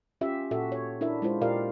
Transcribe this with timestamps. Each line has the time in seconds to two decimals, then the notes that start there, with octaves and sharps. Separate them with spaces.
0.21 C#4 F4 G4 E5
0.51 A#2 F#4 A4 E5
0.72 C#5
1.01 D4 E4 A#4 E5
1.22 G#3 E4 F4 C5
1.41 A#2 F4 G4 A#4 D5 F5